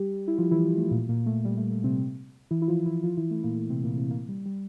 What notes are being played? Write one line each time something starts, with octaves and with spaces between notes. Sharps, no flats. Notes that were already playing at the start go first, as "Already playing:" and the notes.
Already playing: G3 G4
E4
F3 F4
E3 E4
A3
A#2 A#3
A#2 A#3
A3
G3
A3
A3
C3 C4
E3 E4
E4
F3 F4
E3 E4
F3 F4
E3 E4
A3
A#2 A#3
A3
C3 C4
A#2 A#3
C3 C4
A#2 A#3
G3
G3